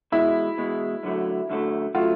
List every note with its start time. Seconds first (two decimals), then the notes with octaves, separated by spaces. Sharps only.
0.12 E2 B2 G#3 E4
0.57 E2 B2 G#3
1.03 F#2 D3 F#3 A3
1.49 F#2 D3 F#3 A3
1.95 C#3 F#3 A3 F4